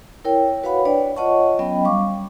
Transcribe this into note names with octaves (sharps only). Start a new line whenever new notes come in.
E4 A#4 C#5 G5
F#4 B4 C#5 F5 F#5 B5
D4 B4 C#5 D5 G5
F4 C#5 D#5 F#5 A5 C#6
F#3 B3 C#4 D#5 G5 B5
G3 F5 C#6 D6